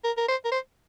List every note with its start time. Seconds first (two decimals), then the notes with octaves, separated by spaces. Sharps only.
0.04 A#4
0.17 A#4
0.28 C5
0.45 A#4
0.52 C5